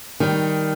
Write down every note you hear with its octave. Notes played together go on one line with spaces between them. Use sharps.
D#3 G3